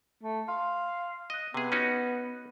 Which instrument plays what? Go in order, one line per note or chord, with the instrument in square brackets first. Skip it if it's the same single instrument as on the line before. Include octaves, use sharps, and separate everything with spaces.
[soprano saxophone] A3
[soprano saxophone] F5 [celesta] C6
[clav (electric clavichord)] D#5 [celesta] D#6 F#6
[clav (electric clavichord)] C3 G#4 [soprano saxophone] B3
[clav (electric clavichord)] C#4 D#4 F#4 [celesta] F#6 D#7